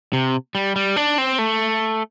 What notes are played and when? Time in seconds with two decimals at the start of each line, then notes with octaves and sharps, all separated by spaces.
0.13 C3
0.55 G3
0.76 G3
0.96 D4
1.18 C4
1.38 A3